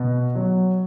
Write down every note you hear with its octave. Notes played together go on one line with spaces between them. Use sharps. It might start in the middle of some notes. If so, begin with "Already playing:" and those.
Already playing: B2
F#3